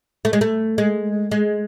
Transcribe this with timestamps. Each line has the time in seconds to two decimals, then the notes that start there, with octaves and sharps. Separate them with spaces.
0.25 A3
0.33 G#3
0.41 A3
0.78 G#3
1.31 G#3